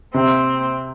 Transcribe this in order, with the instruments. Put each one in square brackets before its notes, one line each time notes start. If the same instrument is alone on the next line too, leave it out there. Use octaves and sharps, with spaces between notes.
[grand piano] C3 [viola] C4